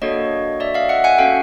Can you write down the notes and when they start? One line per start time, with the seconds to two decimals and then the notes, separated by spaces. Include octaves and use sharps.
0.02 A#3 D4 F#4 A4 C#5 D#5
0.60 D5 E5
0.74 D#5 F5
0.89 E5 F#5
1.04 F#5 G#5
1.18 C#4 F#4 A4 F5 G5